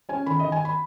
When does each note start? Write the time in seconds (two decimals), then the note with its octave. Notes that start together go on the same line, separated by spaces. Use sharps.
0.09 C#4 G#5
0.26 D#3 B5
0.39 D#3 D#5
0.52 G#5
0.65 B5